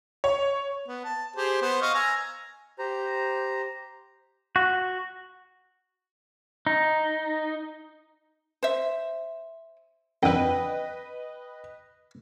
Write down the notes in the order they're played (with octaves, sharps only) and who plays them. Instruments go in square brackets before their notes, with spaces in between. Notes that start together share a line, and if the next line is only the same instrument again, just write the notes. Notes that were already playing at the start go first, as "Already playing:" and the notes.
[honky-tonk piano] C#5
[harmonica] B3
A5
G4 G#4 C5
B3 C5
D#5 F5 C#6
G#5 A#5 E6
[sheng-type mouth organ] G4 C5 A#5
[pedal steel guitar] F#4
D#4
[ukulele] C5 E5
[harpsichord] F2 D3 [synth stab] B4 D#5 [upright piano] G5